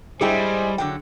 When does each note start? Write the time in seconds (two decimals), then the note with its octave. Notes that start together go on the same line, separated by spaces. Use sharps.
0.21 G#2 G3 E4 G#4 C5 D#5 G5 G#5
0.78 D3 F#3 G5